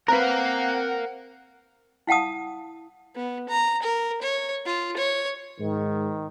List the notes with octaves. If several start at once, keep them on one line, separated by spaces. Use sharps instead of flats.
C4 A#4 B4 F5 F#5 A#5
E4 F5 F#5 A5 D#6
B3
A#5
A#4
C#5
F4
C#5
G#2 D#3